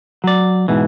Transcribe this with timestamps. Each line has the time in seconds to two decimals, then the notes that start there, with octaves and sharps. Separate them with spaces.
0.24 F#3 D5
0.68 G#2 B2 E3